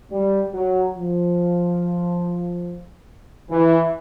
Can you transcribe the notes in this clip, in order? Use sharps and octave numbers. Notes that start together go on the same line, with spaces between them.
G3
F#3
F3
E3